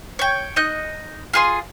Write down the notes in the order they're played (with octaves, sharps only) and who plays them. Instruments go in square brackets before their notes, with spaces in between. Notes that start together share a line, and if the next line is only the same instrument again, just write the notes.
[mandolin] C#5 G5
D#4 D#5 F#6
F4 G#4 C6